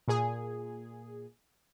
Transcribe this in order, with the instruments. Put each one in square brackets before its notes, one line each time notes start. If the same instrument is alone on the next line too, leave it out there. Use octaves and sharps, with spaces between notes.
[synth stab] A#2 G#4